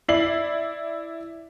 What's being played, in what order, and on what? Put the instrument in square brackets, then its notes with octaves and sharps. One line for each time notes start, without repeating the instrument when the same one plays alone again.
[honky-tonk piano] E4 D5 C7 F#7